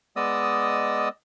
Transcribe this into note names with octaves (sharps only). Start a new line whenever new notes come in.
G#3 B3 D5 D#5 D#6 E6